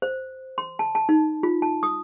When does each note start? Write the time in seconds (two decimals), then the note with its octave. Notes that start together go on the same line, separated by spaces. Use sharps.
0.02 C5
0.58 C6
0.79 A5
0.95 A5
1.09 D#4
1.43 F4
1.62 A5
1.83 D#6